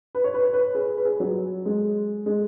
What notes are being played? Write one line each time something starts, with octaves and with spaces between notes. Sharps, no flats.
B4
C#5
B4
C#5
B4
G#4
B4
G#4
F#3
G#3
G#3